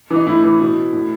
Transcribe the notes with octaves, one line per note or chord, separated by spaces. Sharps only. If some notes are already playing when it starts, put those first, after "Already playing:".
E3
D#4
A2 E4
E3
B2
A2